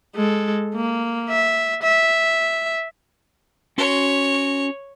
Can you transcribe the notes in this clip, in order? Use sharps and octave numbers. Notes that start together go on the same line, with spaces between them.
G#3 A4
A#3
E5
E5
C#4 F#4 C#5 C6